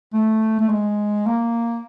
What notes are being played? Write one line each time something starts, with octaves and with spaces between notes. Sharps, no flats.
A3
A3
G#3
A#3